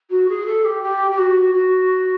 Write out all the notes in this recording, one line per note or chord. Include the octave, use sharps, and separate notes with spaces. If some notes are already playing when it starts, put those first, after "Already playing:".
F#4
G#4
A4
G4
G4
G4
F#4
F#4